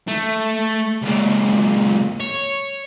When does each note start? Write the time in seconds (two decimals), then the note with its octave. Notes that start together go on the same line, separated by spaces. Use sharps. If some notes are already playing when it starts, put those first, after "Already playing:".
0.08 A3
1.03 C#2 A#2
2.20 C#5